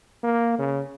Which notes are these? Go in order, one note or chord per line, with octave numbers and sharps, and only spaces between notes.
A#3
C#3